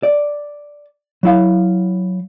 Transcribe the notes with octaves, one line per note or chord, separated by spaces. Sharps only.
D5
F#3 E4 F5